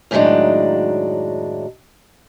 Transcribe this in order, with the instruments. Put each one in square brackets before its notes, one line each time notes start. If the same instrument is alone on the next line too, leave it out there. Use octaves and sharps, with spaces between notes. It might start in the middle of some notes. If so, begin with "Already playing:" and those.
[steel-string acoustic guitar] F#2 A2 D#3 F#3 G#3 D4